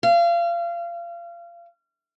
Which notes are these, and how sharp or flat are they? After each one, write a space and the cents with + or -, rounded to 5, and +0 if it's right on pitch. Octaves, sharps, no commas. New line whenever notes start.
F5 -30